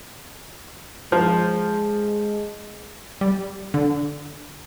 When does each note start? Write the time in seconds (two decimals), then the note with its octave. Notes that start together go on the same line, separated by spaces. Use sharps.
1.12 F3 G#3
3.21 G3
3.74 D3